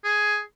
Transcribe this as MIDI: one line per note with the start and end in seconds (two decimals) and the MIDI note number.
0.04 0.40 68